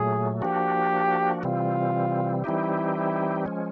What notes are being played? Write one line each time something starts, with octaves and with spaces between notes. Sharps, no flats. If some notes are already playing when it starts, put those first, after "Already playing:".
Already playing: A#2 F#3 A3 G#4
F3 A#3 D4 F#4 G4
C3 E3 G3 C4 F4
E3 G3 C4 D#4 E4 G4
E4
F3 G#3 C#4